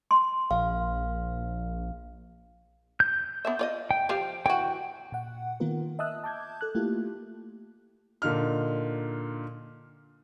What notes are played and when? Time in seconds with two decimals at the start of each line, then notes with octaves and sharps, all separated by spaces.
0.11 C6
0.51 A#1 F5
3.00 G6
3.45 B3 D4 E5
3.59 F4 D5 D#5
3.91 G5
4.09 F3 G4 F5
4.46 E3 F#4 G5
5.12 A#2 F#5
5.60 D#3 A#3 B3 F4 A#4
5.99 D#5 E5 A5 D#6 E6 F#6
6.24 A5 D6 G6 G#6
6.61 A4 F#6
6.75 A3 A#3 E4 F4 G4
8.22 A#2 D3 D#4 F6